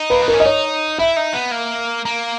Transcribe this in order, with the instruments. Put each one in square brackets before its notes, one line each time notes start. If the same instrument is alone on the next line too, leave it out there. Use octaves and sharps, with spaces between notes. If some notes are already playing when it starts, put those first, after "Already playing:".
Already playing: [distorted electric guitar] D#4
[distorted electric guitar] A#3 [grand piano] B4
[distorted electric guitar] B3
[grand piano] A#4
[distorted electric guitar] C#4
[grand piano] D#5
[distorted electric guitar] D#4 [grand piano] C#5
[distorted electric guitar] E4 [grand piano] E5
[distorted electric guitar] D#4
B3
A#3
A#3